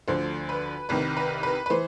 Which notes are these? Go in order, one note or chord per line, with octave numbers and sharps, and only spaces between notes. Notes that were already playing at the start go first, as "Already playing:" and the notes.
D2 D3 F3 C5
B4
C2 C3 D#3 B4
B4
B4
B4
E3 C5